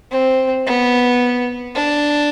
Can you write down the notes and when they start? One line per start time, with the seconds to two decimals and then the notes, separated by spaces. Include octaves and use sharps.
0.11 C4
0.66 B3
1.75 D4